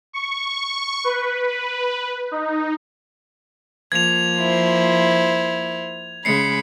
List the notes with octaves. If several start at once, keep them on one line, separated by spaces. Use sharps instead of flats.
C#6
B4
D#4
F3 A#3 G#6 F7
E4 C5
C#3 G#3 B5 C7 C#7